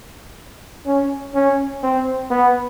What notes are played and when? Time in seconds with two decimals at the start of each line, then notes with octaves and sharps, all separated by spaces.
0.86 C#4
1.34 C#4
1.83 C4
2.31 B3